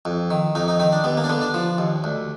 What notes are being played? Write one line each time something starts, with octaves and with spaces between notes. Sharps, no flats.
F2
D#3
F2 D#4
D#4
D#3 D#4
D4
D#2 B3
A#3
D4
D3 B3
D4
F3
D#2
D2